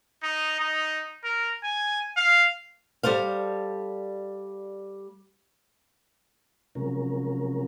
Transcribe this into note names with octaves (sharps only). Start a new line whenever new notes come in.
D#4
D#4
A#4
G#5
F5
G3 A4 C5 F5
C3 F3 F#3 G#3 C#4 A#4